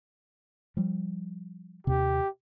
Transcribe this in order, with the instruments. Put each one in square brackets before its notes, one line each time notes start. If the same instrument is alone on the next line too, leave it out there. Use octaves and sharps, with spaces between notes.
[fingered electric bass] F3 G3
[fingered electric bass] D#2 C3 [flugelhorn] G4